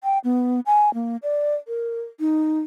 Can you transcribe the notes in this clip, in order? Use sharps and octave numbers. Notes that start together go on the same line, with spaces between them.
G5
B3
G#5
A#3
D5
A#4
D#4